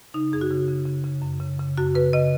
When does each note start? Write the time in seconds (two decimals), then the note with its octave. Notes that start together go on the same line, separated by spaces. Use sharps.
0.14 C#3 D#4
0.32 F#2 G#4
0.41 F#4
0.50 C#3
0.68 C#3
0.86 C#3
1.04 C#3
1.22 F#2
1.40 C#3
1.59 C#3
1.77 F#2 F#4
1.95 C#3 B4
2.13 C#3 D#5